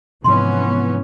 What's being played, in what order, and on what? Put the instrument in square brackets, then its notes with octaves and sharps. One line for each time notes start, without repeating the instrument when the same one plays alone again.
[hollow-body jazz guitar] B1 G#2 [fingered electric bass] C3 F3 [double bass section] E3 B3 C#4 [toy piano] C6